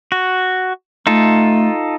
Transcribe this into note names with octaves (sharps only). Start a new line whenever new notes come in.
F#4
A3 D#4 F4 A4